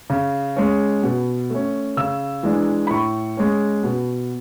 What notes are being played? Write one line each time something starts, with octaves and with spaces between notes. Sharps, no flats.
C#3
G#3 C#4
B2
A3 C#4
C#3 E6
E3 G#3 D4
B5
A2 C#6
G#3 C#4
B2